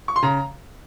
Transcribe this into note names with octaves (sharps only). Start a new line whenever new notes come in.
C#6
C6
C#3 A#5